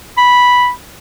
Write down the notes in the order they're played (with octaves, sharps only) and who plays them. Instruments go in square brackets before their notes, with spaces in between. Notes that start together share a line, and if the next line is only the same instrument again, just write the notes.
[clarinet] B5